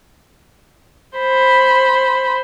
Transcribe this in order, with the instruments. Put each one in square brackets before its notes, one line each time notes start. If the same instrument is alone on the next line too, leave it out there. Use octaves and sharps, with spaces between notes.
[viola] C5 B5